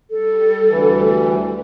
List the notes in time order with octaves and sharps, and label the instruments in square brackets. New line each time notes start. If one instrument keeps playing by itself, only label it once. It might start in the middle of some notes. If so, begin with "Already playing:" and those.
[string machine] G3 [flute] A4
[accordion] D2 E3